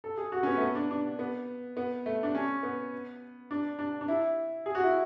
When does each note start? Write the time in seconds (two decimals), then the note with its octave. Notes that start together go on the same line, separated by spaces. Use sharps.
0.04 A4
0.17 G#4
0.32 F#4
0.43 C#4
0.47 B3
0.57 A3
0.61 B3
0.75 D4
0.91 D4
1.19 B3
1.77 B3
2.06 A3
2.23 D4
2.35 C#4
2.63 B3
3.51 D4
3.79 D4
4.01 D4
4.08 E4
4.66 G#4
4.75 F#4
4.83 E4